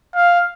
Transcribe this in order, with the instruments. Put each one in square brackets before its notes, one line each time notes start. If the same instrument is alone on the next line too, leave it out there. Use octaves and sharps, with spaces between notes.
[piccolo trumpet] F5